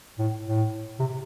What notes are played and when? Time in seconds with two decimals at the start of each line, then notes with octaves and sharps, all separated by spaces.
0.19 A2
0.46 A2
1.00 C3